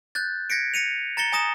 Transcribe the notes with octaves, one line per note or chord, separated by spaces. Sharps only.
F#6 G6 A6
G#6 A#6 B6 C#7 D7
A#6 C#7 D#7 F7
A#5 A6 A#6 C#7 G7
G#5 A#5 D#6 A#6 E7